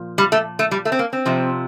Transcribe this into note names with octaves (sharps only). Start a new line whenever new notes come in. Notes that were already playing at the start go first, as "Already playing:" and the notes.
Already playing: A#2 F3
G3
A3
A3
G3
A3
C4
A#3
C4
F2 C3 F3